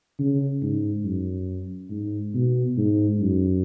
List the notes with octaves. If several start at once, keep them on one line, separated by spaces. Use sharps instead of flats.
C#3
G#2
F#2
G#2
B2
G#2
F#2